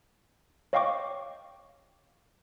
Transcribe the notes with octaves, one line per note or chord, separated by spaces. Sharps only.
C#5 D#5 F5 G5 C#6 D6